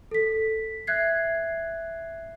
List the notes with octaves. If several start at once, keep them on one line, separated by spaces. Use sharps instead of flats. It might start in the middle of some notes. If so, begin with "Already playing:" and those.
A4 B6
E5 F#6 G#6 C7